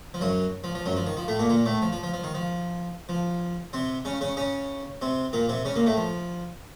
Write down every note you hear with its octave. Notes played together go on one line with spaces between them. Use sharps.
F3
F#2 F#3
F3
F3
F#2 F#3
F3
D#3
F3
A2 A3
A#2 A#3
A#2 A#3
A2 A3
F3
F3
F3
F3
D#3
F3
F3
C3 C4
C#3 C#4
C#3 C#4
C#3 C#4
C3 C4
A#2 A#3
C3 C4
C#3 C#4
A#2 A#3
A2 A3
F3